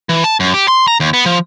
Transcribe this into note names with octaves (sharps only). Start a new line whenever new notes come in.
E3
A5
F#2
G4
C6
A#5
D#2
B3
F3